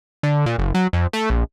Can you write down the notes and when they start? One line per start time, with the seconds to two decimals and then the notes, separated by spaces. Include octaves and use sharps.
0.23 D3
0.46 A#2
0.58 F#1
0.74 F#3
0.93 F2
1.13 A3
1.30 A#1